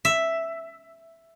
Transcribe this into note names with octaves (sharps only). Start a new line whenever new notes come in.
E5